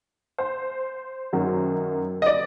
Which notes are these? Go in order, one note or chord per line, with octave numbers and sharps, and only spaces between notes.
C5
F#2 D#3 F#3
D#5
D5